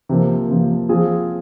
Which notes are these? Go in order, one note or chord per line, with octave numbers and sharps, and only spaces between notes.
C3 F3 A#3
C3 F3 A#3
F3 C4 F4 G#4